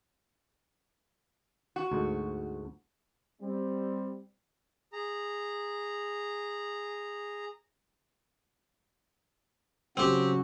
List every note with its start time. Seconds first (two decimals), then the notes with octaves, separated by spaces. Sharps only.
1.76 F#4
1.92 D2 G#2
3.42 G3 C4
4.93 G#4 A#5
9.97 C#3 F#3 C4 F#4 G4